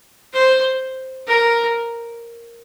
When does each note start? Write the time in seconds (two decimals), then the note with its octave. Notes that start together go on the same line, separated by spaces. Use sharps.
0.33 C5
1.27 A#4